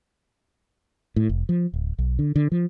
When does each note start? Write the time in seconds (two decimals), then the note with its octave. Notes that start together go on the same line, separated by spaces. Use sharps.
1.16 A2
1.29 F1
1.49 F3
1.74 D1
1.98 B1
2.19 D3
2.36 D3
2.52 F3